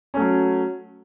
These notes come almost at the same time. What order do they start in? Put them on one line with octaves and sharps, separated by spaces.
C#4 A3 F#3